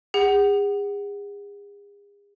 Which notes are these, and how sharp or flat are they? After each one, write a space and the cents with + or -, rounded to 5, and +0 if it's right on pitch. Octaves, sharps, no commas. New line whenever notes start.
G#4 -40 F#5 +20